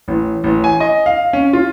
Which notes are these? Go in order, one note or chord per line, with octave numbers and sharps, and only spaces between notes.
A1
A1
G#5
D#5
F5
C#4
F4